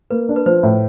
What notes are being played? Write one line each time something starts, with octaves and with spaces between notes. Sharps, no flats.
A#3 B4
D4
B4
F3 C5
A2